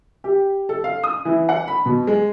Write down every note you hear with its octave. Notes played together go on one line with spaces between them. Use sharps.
G4
A4
F5
D#6
E3
F#5
B5
B2
G#3